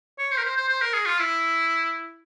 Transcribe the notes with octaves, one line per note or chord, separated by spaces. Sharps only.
C#5
C5
A#4
C5
C5
C5
A#4
G#4
F4
E4